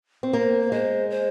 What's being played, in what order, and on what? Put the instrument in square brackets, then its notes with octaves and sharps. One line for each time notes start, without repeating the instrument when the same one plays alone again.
[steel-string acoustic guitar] C4
[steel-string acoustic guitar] A#3 [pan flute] C5
[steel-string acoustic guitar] G#3 [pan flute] C5
[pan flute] C5